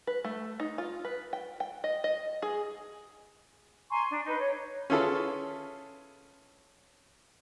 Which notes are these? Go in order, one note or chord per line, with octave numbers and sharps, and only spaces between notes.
B4
A3
D#4
F4
B4
G5
G5
D#5
D#5
G#4
G#5 A#5 C6 C#6
D4
D#4 B4
C#5
C#4 E4 F4 G#4 A4 B4